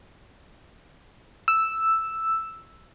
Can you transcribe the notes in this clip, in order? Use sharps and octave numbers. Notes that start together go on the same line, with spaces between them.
E6